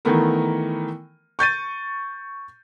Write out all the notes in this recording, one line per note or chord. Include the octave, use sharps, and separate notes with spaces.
D#3 E3 A3 B3 A#4
C#6 G6 A6 D#7